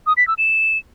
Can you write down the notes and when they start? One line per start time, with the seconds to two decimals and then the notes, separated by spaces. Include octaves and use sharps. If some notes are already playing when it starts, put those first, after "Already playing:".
0.07 D#6
0.17 B6
0.28 E6
0.38 E7